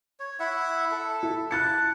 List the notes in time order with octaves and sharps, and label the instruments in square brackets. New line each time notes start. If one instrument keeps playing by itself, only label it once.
[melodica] C#5
E4 E5 F#5
A4
[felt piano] E4
[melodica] A5 [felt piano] F#6 A6 C#7